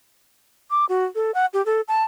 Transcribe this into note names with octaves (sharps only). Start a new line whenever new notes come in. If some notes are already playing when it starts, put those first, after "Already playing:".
D6
F#4
A4
F#5
G4
A4
A5